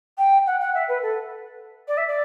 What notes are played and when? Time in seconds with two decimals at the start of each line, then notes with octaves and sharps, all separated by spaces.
0.18 G5
0.46 F#5
0.60 F#5
0.74 E5
0.88 B4
1.02 A4
1.88 D5
1.97 E5
2.08 D5